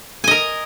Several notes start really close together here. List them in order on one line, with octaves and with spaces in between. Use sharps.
G#5 D#5 A#4